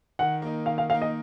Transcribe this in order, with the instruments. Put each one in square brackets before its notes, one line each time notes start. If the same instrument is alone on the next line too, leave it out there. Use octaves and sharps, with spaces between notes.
[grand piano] D#3 [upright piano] F#5
[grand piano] A#3 D#4
[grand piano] D#3 [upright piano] F5
[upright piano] F5
[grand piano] A#3 D#4 [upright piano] F5
[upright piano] D#5